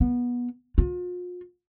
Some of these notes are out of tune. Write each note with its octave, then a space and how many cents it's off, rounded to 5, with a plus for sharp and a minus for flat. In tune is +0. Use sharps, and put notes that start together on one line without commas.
B3 -20
F4 +40